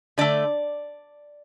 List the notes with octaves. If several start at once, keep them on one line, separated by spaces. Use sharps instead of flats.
D3 A3 D5